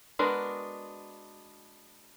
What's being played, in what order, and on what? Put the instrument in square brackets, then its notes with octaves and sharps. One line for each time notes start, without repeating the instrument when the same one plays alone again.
[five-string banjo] G#3 B3 D4 F#4 A#4